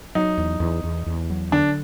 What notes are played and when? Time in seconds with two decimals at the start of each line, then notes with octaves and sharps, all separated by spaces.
0.15 F#3 D#4
0.38 E2
0.60 E2
0.84 E2
1.06 E2
1.30 F#3
1.52 D3 D4